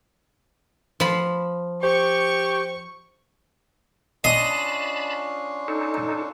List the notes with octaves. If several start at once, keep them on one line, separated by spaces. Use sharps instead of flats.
F3 B5
G4 C5 C#6
C#4 D4 F4 D#5 A5 B5 C7
D#4 A4